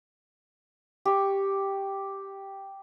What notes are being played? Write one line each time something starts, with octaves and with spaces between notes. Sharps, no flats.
G4 C#6